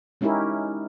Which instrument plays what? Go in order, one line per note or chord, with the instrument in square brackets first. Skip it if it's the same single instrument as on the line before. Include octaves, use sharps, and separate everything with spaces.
[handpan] G#3 C#4 D#4 E4 G4 A#4